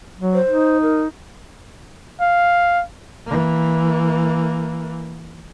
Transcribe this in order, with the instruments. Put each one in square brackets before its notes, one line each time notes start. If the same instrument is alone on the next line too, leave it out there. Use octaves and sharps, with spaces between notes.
[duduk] F#3
[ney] C5
[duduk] D#4
[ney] A#4
[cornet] F5
[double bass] E3 A#3